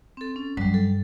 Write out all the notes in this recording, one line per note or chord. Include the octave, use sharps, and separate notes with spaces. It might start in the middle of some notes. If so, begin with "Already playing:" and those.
C4 A4
C#4
G2 D3 F#3 G3
A4